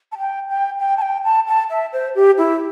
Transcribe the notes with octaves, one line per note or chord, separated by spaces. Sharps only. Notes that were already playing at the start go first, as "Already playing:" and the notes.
A5
G5
G5
G5
A5
G5
A5
A5
E5
C5
G4
E4